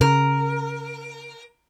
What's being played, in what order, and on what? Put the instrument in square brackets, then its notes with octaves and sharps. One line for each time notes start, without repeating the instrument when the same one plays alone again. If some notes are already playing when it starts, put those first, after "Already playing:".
[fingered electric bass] C#3 [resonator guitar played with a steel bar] A#4